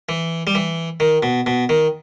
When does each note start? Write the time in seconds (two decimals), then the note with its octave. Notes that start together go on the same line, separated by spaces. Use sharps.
0.09 E3
0.47 G3
0.55 E3
1.00 D#3
1.23 B2
1.46 B2
1.69 D#3